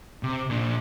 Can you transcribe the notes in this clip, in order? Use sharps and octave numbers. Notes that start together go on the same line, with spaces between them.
C3
A#2 D4